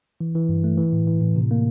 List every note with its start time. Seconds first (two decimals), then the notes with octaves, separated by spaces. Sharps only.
0.21 E3
0.35 E3
0.49 G2
0.64 A3
0.78 E3
0.93 A2
1.07 E3
1.21 A2
1.36 C3
1.51 A#3